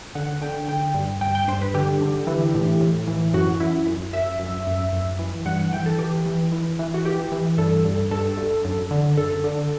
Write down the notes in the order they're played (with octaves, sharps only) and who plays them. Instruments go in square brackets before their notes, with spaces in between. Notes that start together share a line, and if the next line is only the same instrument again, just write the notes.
[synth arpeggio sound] D3 F#5
D3 G5
D3 G5
G2
G2 G5
G5
G2 C5
B4
D3 G4
D3
E3
A2
A2
E3
F#2 F#4
F#2 E4
F#2
F#2 E5
F#2
F#2
F#2
E3
G2 F#5
F#5
E3 G5
A4
E3 G4
E3
E3
E3
F#4
E3 G4
E3
G2 A4
G2
G2 A4
G2
F#2
D3
F#2 A4
D3